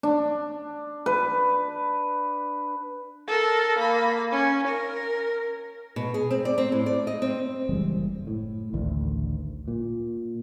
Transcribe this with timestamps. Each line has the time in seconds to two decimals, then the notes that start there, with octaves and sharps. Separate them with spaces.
0.03 D4
1.06 B4
3.28 A4 A#4
3.78 A#3 B5
4.32 C#4
4.67 A#4
5.96 B2
6.14 G#4
6.31 C4
6.45 D5
6.58 C4
6.72 A2
6.86 D5
7.07 D#5
7.22 C4
7.69 F#1 E3 G3 G#3
8.27 A2
8.73 A1 D2 D#3
9.68 A#2